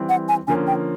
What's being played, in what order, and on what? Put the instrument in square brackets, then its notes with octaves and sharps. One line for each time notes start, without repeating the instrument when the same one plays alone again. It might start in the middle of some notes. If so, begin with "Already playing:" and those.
Already playing: [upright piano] E3 G3 C4
[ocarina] F#5
G#5
[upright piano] D3 F3 A#3 C#4 [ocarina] G#5
[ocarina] G5